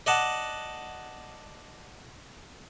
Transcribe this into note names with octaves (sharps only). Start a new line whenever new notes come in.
D5 D#5 F#5 A5